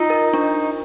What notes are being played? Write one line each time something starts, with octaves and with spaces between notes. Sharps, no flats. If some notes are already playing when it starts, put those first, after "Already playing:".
Already playing: D#4 F4
A#4
D4